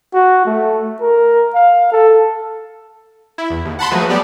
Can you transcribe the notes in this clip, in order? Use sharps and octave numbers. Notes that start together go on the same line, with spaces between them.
F#4
A3
A#4
F5
A4
E4
E2
D#2
F#5 A5 B5 C6
F3 F#3 A3 F#4 G#4 B4
G3 B3 G4 D5